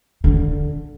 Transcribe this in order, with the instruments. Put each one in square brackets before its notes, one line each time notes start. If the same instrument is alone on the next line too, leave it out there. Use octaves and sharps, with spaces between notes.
[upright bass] D3